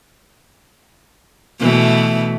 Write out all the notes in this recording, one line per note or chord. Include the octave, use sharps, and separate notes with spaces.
B2 E3 A3